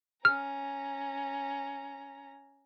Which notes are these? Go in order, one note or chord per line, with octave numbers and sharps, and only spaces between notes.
C#4 A#5 F6